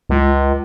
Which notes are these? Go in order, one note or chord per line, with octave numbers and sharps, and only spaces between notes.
C#2